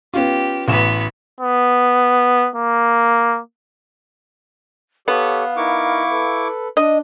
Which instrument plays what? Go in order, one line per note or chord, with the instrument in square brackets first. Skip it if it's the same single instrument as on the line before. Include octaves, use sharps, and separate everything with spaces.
[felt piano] B3 C#4 F4 [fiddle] G4
[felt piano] A1 E7 [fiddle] B3 F#4
[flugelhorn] B3
A#3
[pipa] B3 [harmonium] G4 A4 C#5 [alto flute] F5
[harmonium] D#4 A#4 [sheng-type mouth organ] E4 C#6 D6
[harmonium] A4 B4
[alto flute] D4 [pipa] D#5